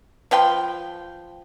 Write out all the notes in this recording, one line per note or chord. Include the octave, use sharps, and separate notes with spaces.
F3 B4 G5 C6